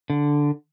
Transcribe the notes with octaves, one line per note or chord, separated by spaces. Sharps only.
D3